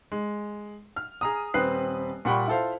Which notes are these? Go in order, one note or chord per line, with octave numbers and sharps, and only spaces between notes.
G#3
F6
G#4 A#5 D#6
D#1 C4 B4 F#6 C7
A#2 G3 F#5 G5 B5 C#6
E4 F4 A4 C5 F5